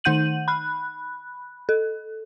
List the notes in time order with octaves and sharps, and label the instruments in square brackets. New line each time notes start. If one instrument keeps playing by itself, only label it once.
[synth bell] D#3 D#4 F#5 G6 D#7 F#7
B5 F#6
A4